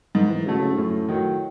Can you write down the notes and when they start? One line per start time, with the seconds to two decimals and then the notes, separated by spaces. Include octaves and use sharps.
0.15 G#2 D#3
0.30 E3
0.46 C#3 F#3 A3
0.61 C#3
0.73 G#2
0.77 F#2 A2
1.08 D#3 F#3